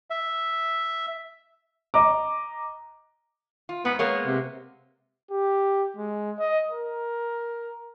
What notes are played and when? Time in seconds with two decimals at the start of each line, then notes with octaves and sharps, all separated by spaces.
0.10 E5
1.94 D#5 A#5 D6
3.69 F4
3.85 G#2 B3
3.99 G#3 A#3 B3 C#5
4.26 C3
5.31 G4
5.97 G#3
6.39 D#5
6.71 A#4